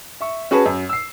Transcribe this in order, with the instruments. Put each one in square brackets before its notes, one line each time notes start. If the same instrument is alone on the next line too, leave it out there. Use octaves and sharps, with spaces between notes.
[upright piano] E5 C#6
C#4 F#4 G#4 B4 A5
F#2
E6 C7